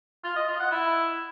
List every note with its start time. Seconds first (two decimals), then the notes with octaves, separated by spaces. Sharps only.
0.24 F4
0.36 D#5
0.48 F4
0.60 F#5
0.72 E4